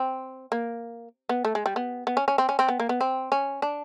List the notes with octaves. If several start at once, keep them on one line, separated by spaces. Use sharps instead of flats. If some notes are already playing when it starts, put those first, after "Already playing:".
Already playing: C4
A#3
B3
A3
G#3
G3
B3
B3
C#4
C#4
C4
C#4
C4
B3
A#3
B3
C4
C#4
D4